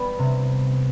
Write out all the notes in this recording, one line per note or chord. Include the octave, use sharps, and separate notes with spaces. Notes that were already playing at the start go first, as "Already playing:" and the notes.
Already playing: G3 B3
C3